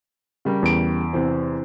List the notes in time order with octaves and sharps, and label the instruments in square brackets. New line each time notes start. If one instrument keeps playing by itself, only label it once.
[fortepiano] C#3 G3 A#4
[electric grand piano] E2 D7
[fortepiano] C3 E3 C5